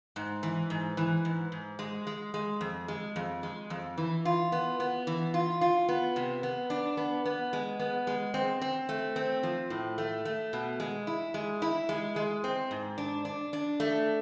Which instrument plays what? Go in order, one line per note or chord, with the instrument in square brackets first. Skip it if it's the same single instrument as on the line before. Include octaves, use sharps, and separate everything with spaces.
[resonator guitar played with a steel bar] G#2
E3
G#2
E3
G#2
G#2
G#3
G#3
G#3
F2
G#3
F2
G#3
F2
E3
F4
B3
B3
E3
F4
F4
B3
C3
B3
D4
B3
B3
G#3
B3
G#3
C4
C4
A3
C4
F3
A2
A3
A3
B2
G#3
E4
G#3
E4
G#3
G#3
C4
G#2
D4
D4
D4
A3